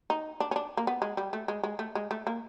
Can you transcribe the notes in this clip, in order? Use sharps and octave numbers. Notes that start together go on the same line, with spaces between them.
D#4
D4
C#4
D4
A#3
B3
G#3
G3
A3
G#3
G#3
A3
G#3
A3
A#3